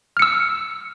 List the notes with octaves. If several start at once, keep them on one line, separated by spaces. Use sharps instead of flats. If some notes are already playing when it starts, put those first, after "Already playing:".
E6 F6 C#7